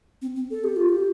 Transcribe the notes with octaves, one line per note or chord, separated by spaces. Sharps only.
C4
C4
A4
G4
F4
G4